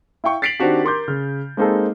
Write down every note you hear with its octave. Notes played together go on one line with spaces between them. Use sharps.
E4 F5 G5 C#6
A6 B6 C7 D7 F7 F#7
D#3 C4 D4 F#4 G4
A#4 C6 D6 G6
C#3 F6
G#3 A#3 C4 D#4 G#4 A4